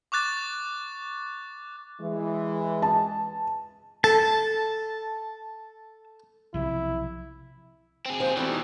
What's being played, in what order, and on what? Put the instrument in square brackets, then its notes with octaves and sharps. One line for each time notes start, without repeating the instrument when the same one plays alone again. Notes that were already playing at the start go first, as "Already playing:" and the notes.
[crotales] C#6 D6 F#6 A6
[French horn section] E3 G#3
[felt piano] A5
[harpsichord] A4 [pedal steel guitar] A5
[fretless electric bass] B1 C3 F3 [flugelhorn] E4
[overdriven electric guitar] C4 G#4
[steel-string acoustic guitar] D#2 F3 G#3 [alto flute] C5
[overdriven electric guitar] B2 E3 [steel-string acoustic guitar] G3 A3 [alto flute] C4
[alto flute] D#4